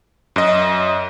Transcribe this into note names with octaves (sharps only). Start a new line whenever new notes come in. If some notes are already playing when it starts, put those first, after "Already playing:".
F#2 D#5